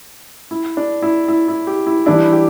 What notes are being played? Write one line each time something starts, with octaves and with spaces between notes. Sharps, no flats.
E4
D4
E4
E4
E4
G4
E4
E3 G3 D4 E4
G4